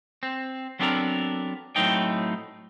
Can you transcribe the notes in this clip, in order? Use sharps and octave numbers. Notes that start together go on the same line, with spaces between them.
C4
F#3 B3 C4 D4 A4 A#4
A2 F#3 A3 C4 D#4 G5